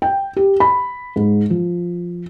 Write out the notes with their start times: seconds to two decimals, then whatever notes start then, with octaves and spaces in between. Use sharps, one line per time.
0.02 G5
0.36 G4
0.60 B5
1.16 G#2
1.50 F3